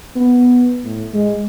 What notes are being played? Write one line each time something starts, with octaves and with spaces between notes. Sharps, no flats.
B3
A2
G#3